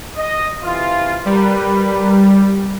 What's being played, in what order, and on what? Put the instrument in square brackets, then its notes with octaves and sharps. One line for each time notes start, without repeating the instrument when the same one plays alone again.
[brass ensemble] D#5
C3 E3 F4
[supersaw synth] G3 [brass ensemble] A#4 B4